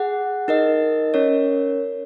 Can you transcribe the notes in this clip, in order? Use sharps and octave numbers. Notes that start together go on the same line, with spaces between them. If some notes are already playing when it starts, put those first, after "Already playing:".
Already playing: G#4 F#5
D#4 A#4 D#5
C#4 A#4 C#5